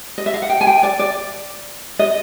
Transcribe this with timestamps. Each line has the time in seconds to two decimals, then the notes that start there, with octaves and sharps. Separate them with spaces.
0.18 D#5
0.26 E5
0.34 F5
0.42 F#5
0.50 G5
0.61 G#5
0.67 G5
0.83 D5
0.99 D5
1.99 D#5